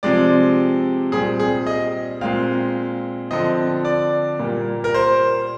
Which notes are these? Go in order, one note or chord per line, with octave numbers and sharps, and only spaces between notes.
C3 F3 G#3 C4 D5
A#2 G3 C4 G#4
G#4
D#5
A#2 G#3 C4 F5
D3 F3 C4 D#5
D5
A#2 G3 A#3
A#4
C5